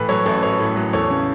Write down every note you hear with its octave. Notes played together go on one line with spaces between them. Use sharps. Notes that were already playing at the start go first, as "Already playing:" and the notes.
Already playing: A2 E3 B4
F#3 A4 C#5
A1 A4
A1 A4 C#5
A2
F#3
E2 A4 C#5
C#3